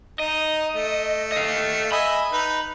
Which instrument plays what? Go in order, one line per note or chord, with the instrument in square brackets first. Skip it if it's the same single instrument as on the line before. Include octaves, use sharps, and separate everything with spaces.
[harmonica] D#4 [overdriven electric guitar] D#5
[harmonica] A3
[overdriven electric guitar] D#5 F5
[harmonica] D#5 E5 G#5 [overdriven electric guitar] B5
[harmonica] D#4 B4